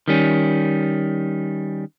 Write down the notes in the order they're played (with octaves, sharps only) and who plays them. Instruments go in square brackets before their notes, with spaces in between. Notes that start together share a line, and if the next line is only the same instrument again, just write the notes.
[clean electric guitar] D#3 G3 C#4